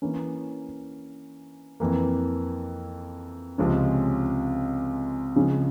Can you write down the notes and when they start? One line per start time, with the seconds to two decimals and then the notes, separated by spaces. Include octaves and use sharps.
0.02 E3 A#3 C#4
1.80 F2 E3 A#3
3.58 C#2 C3 F3 G#3 C#4
5.36 C#3 F3 G#3 C#4